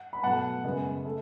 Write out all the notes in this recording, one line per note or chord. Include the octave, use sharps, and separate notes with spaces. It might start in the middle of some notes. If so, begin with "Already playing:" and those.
Already playing: F#5
B5
B2 F#3 A3 F#5 A5
F#2 C#3 G#3 B3
A3